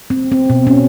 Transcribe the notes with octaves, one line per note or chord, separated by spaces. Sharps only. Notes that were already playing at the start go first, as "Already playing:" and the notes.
C4
C4
B2
C#4